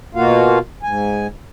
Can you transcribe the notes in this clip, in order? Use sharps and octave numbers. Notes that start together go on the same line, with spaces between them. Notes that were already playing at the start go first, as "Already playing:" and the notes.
B2 A#3 F4 F#4 F5
G#2 G#5